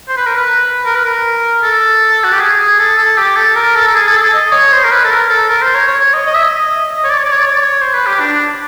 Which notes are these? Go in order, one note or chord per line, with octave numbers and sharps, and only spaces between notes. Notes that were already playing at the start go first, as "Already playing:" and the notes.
C5
B4
A#4
B4
A#4
B4
A#4
A4
F#4
G4
G#4
G#4
A4
A4
G4
A4
A#4
A4
A4
G#4
A4
G#4
A4
D#5
C#5
C5
A#4
B4
A4
A#4
A4
A#4
C5
C#5
C#5
C#5
D#5
D#5
E5
D#5
C#5
D5
C#5
D5
C#5
D5
C#5
D5
C#5
C5
B4
G4
D4
D4